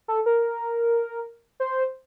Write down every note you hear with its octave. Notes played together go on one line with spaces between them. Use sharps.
A4
A#4
C5